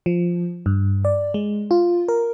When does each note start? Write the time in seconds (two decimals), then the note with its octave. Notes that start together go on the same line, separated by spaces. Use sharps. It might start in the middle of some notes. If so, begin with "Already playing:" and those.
0.06 F3
0.66 G2
1.05 D5
1.34 G#3
1.71 F4
2.08 A#4